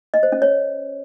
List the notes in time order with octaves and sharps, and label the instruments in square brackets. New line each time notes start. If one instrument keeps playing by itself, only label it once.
[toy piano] D#5
C5
C#4
C#5